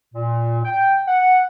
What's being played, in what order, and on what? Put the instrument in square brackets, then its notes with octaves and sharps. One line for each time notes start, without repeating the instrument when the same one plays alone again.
[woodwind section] A#2
G5
F#5